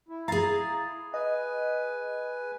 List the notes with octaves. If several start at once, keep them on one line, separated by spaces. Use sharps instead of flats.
E4
G#4 F5 A#5 A6
B4 D#5 G#5